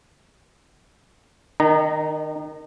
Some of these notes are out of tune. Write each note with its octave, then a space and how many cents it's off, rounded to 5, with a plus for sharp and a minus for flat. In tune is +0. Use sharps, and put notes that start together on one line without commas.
D#3 +0 D#4 -40 A#5 +0